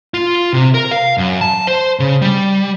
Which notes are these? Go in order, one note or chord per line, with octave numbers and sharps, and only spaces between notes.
F4
C3
A#4
F5
F#2
A5
C5
C#3
G3